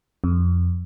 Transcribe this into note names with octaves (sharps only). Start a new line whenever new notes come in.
F2